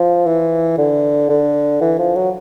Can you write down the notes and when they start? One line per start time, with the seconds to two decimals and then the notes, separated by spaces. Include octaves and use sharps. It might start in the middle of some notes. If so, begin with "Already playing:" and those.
Already playing: F3
0.26 E3
0.78 D3
1.29 D3
1.81 E3
1.98 F3
2.15 F#3